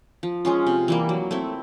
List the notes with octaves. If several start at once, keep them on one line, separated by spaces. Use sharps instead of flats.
F3
G#3 C#4 F4
C3
E3 G3 A#3
F#3
A3 C4 E4